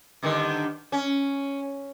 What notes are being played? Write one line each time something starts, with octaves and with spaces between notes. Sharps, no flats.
G2 D3 D#3
C#4